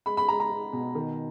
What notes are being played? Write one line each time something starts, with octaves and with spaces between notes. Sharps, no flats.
G#3 B5
B5
G#3 A#5
A#5
G#3
B2
D#3